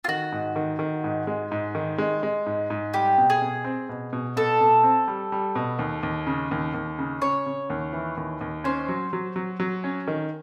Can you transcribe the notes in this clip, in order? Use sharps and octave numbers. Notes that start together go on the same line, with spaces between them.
F4
D#3 F#4
G#2
D#3
D#3
G#2
G#3
G#2
D#3
G#3
G#3
G#2
G#2
G3 G4
B2
G#4
B2
C4
B2
B2
B2 A4
B2
C4
G3
G3
B2
D#2
D#2
C#3
D#2
D#2
C#3
C#3 C#5
C#3
D#2
E3
D#2
D#2
C#4 C5
F#3
F#3
F#3
F#3
C#4
D#3